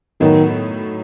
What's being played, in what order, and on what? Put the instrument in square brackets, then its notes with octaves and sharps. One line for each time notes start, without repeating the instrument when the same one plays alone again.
[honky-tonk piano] A2 F#3 B3 D#4 F#4 [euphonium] D#3